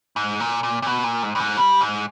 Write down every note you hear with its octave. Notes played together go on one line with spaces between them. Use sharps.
G#2
A#2
A#2
A#2
B2
A#2
G#2
G2
G#2
G3
G#2